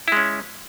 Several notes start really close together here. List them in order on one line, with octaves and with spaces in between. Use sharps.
E4 G#3 C#4